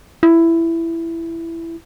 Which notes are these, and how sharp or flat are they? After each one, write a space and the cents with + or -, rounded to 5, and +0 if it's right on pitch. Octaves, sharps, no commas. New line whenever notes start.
E4 +10